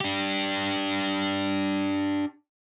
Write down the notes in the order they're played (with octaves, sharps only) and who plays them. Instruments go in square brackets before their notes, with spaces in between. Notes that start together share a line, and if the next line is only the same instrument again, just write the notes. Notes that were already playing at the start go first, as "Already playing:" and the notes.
[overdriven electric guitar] D4 G4